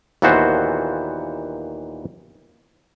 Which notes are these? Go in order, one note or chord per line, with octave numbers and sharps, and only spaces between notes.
D#2 A#2 E3 B3 F#4 C5